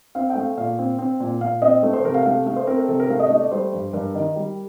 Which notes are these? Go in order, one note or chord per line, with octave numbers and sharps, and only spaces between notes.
C4 F5
G5
A3 F5
A#2 F5
C4
C4
A#2
A#2 F5
C4 D#5
A3
C5
C3 A#4
F5
A3 F5
A3 F5
C5
C4 A#4
A4
C3 A4
A#4
A3 F5
D#5
A3 D#5
D5
G3 C5
G2
G2 A#4
D#3
G3